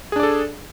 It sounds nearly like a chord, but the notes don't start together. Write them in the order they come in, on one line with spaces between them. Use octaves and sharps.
G#4 D4 D5 A4